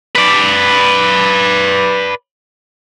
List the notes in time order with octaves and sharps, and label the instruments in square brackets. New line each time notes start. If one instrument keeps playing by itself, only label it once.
[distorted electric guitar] B4 D5